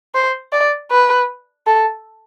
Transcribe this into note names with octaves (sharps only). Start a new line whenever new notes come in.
C5
D5
B4
A4